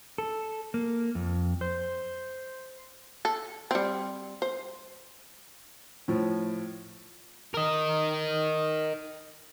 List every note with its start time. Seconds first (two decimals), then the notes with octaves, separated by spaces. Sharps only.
0.18 A4
0.74 A#3
1.15 F2
1.61 C5
3.25 A4
3.71 G3 C4
4.42 C5
6.08 A2 F3
7.54 A#4 D#5